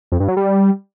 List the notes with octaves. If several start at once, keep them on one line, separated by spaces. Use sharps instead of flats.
F2
G2
F#3
G3